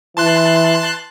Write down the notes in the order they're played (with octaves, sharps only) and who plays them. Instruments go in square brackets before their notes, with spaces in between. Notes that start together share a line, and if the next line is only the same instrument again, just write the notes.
[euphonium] E3 [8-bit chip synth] A5 C6 F#6